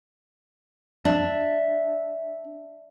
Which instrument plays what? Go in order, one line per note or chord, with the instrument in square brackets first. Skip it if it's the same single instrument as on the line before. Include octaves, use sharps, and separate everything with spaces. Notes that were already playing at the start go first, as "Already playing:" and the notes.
[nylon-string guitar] D4 [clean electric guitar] E5